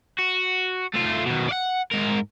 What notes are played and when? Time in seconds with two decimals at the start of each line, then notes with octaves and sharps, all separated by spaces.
0.19 F#4
0.94 A3 F4
1.26 B2 D#3
1.49 D5 F#5
1.92 G#2 A#4